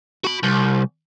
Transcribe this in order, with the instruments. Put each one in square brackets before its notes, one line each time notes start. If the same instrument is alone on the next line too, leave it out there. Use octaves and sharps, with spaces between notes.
[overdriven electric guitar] F#4 B5
C2